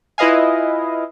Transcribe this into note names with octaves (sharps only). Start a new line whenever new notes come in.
E4 F4 B4 D#5 F5 G#5